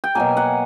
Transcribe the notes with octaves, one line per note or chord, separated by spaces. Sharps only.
G5
B2 F#3 A#3 G#5
F#5